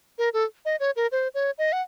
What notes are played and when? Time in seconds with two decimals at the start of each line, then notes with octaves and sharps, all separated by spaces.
0.18 A#4
0.33 A4
0.65 D#5
0.80 C#5
0.96 A#4
1.12 C5
1.35 C#5
1.58 D#5
1.72 F#5